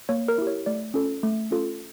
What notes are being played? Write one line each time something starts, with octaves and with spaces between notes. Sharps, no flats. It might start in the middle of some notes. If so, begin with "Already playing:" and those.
A#3 C#5
A#4
E4 G4
C#5
A3 D5
C#4 F4 A4
A3
C#4 F4 A4